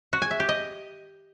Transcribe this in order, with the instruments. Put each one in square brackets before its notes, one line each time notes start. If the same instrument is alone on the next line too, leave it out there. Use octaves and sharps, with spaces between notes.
[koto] F#4
G#5
E5
G4
D#5